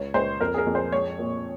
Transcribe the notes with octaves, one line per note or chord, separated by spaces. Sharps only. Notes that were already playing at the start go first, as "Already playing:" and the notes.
Already playing: C#2 C#5
C#2 C5
F2 A#4
G#4
A#4
F2
C5
G#3 C#5
A#2